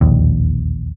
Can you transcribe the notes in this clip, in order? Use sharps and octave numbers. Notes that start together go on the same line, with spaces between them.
E1 A#1 D#2